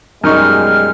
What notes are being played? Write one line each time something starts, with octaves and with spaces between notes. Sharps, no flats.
F#2 B2 G3 G#3 D#4 C#6 F6